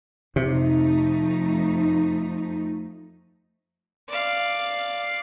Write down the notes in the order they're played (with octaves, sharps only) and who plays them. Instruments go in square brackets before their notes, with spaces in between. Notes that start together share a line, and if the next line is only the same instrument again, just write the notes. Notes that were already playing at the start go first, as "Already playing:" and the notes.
[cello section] F2 A3 D#4 [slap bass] C3
[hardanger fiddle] D5 F5